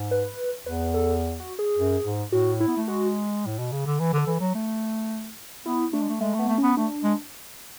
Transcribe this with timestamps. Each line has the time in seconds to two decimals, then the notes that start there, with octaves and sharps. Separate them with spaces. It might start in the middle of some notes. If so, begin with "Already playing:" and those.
Already playing: G#2
0.11 B4
0.66 E2 B4
0.94 A4
1.40 F#4
1.59 G#4
1.77 F#2
2.04 G#2
2.32 A2 F#4
2.60 E4
2.67 B3
2.77 A3
2.88 G#3 F#4
3.46 A2
3.59 B2
3.72 C#3
3.86 D3
4.00 E3
4.13 D3 A4
4.27 E3
4.40 F#3
4.55 A3
5.66 B3 E4
5.93 A3 D4
6.01 G#3
6.09 A3
6.21 G#3 A3
6.34 A3 B3
6.48 A3
6.58 B3 C#4
6.77 A3 D4
7.04 G#3